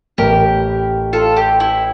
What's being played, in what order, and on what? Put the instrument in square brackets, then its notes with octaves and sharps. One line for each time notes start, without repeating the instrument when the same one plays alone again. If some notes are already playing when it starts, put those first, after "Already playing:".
[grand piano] A1 A2 E3 [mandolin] G4 A#4
[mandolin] F4 A4
G4
E4